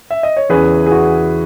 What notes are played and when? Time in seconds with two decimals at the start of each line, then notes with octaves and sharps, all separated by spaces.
0.11 E5
0.23 D#5
0.37 C#5
0.49 E2 C#3 E3 G#4 B4
0.86 G#4
0.91 F#4